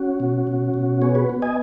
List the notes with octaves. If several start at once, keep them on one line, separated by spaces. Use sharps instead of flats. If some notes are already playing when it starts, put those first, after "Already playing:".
Already playing: C#4 F#4
B2
B2
B2
B3 G#4 C#5
F#4 B4
B3
D#5 G#5